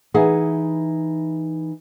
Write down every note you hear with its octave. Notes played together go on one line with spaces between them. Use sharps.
E3 D#4 G#4 E5 F#5